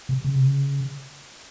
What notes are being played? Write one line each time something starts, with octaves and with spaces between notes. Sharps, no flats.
C3
C#3
C3
C#3